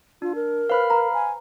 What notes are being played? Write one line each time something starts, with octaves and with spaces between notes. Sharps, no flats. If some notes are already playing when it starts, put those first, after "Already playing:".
D4 F4
A#4
B4 C5 F5 B5 F6
A#5
G#5